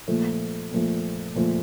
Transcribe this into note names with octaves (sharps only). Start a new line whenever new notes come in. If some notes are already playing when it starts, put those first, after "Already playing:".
A#2 F3 A3
A#2 F3 A3
A#2 F3 A3